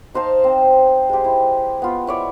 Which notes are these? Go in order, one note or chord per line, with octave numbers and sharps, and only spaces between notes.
D#4 C5 F5 A5
C4
G#3 G4
E4
B3 F4
E4 C#5 D5